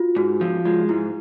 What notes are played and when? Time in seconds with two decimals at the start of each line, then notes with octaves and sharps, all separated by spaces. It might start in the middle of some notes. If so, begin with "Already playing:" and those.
Already playing: F4 F#4
0.16 G#2 F#4
0.41 F3
0.65 G#3 F4
0.89 G#2 E4